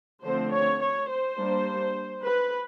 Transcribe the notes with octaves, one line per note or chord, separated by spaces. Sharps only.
D3 F3 A3 C4 C5
C#5
C#5
C5
G3 A#3 D4
B4